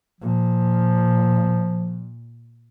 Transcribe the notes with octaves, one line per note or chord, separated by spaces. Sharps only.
A#2 F3